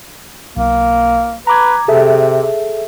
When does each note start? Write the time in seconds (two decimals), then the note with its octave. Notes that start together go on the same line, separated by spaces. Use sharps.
0.56 B1 A#3
1.47 B4 A#5 D6 G#6
1.88 C3 G#4 A4 E5